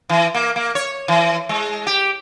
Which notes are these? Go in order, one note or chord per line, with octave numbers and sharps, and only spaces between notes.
E3
A#3
A#3
C#5
E3
G#3
G4